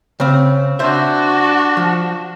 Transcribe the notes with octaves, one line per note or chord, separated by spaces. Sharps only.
C#3 C4
D4 F#4 C5 E5
F3